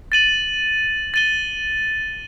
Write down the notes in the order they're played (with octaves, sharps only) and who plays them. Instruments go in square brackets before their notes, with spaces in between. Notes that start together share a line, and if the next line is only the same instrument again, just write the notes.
[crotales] A6 D#7 F#7
A6 D#7 G7